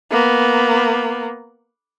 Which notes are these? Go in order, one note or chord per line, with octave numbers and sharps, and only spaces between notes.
A#3 B3